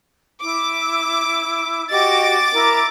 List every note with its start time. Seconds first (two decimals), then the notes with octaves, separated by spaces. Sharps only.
0.41 E4 D6
1.91 F#4 G4 D#5 D6 A6
2.53 E4 A#4